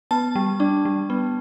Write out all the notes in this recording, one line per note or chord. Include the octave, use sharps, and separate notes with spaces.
B3 A5
G3
D4
G3
B3